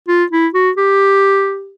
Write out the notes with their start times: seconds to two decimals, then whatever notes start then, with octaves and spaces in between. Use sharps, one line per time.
0.08 F4
0.31 E4
0.54 F#4
0.77 G4